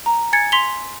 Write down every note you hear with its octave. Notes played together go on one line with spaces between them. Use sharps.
A#5
G#5 G#6 A6 C#7
C6 B6 F7 G7